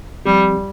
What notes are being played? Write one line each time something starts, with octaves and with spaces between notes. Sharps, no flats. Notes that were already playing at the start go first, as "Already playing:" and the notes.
F3 G3 C4 G4